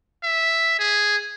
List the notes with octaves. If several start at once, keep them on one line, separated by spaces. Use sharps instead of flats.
E5
G#4